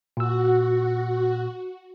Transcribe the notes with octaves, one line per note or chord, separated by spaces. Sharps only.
A#2 F#4 E6